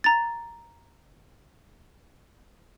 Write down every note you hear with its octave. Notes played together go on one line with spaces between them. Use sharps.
A#5 A6